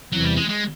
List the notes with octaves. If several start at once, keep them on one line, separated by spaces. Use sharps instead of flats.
E2 C3 E3 F#3
G3
G#3
G#3